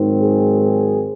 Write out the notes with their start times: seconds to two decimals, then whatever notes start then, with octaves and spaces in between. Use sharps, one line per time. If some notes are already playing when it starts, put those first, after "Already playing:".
Already playing: G#2 D#3 F#3 C4
0.19 G#4
0.59 G#4